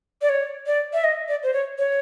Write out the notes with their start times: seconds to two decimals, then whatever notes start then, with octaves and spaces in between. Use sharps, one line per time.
0.22 D5
0.29 C#5
0.66 D5
0.93 E5
1.04 D#5
1.28 D5
1.43 C5
1.54 C#5
1.78 C#5